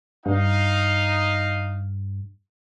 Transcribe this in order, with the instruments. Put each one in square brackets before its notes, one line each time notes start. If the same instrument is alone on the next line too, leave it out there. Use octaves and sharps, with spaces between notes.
[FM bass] G2 [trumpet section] D#4 F5